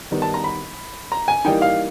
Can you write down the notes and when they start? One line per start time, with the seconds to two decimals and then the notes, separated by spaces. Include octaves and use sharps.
0.11 D#3 G3 B3 D#4
0.22 A5
0.34 A#5
0.44 B5
1.12 A#5
1.28 G#5
1.45 E3 G3 A#3 D#4 G5
1.62 F5